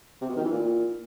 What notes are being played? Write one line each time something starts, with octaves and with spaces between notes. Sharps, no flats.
C3
B2
D#3
E3
A#2